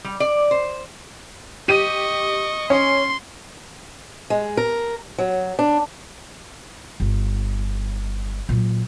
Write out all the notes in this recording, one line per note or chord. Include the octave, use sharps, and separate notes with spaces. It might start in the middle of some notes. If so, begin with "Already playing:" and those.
G3
D5
C5
G4 D#5 C#6 D#7
C#4 C6
G#3
A#4
F#3
D4
G1
A#2 F#3